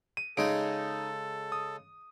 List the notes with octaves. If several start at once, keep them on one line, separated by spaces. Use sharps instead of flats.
D#7
C#3 G#3 D#4 A4 G#5 D7
D#6